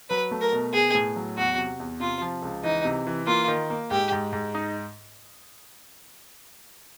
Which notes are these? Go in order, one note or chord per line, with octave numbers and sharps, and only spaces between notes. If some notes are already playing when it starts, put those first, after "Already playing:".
F#3 B4
A3
A#4
B2
B3 G#4
A2
F#3
E2 F#4
C3
E2
C3 F4
F3
C#2
E3 D#4
C3
E3
A#3 F4
D#3
A#3
G#2 G4
G#2
G#2
D#4